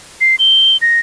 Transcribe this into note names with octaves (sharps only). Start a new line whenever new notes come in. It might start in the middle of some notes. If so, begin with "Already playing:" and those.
C7
G7
A#6